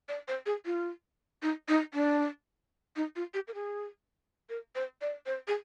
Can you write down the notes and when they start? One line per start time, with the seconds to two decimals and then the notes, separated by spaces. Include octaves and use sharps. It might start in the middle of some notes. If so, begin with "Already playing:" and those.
0.09 D5
0.28 C5
0.46 G#4
0.66 F4
1.43 D#4
1.68 D#4
1.94 D4
2.96 D#4
3.16 F4
3.34 G4
3.48 A#4
3.54 G#4
4.50 A#4
4.75 C5
5.01 D5
5.26 C5
5.48 G#4